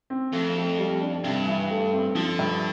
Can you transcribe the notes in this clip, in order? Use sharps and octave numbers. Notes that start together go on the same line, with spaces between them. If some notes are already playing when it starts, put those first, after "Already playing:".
C4
F2 A3
A3
G3
D4
G2 C3
E3
A3
C4
D3 F3
G2